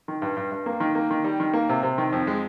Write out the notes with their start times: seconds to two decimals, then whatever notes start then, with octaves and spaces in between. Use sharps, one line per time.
0.08 D#3
0.22 G2
0.37 G2
0.52 G2
0.66 A#3
0.80 D#3
0.95 A#3
1.11 D#3
1.24 G3
1.40 D#3
1.53 A#3
1.69 C3
1.83 C3
1.98 D#3
2.13 F2
2.27 G#3